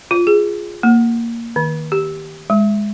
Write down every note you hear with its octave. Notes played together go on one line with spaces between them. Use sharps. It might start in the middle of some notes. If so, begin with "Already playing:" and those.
F4
G#4
A#3
D#3
G4
G#3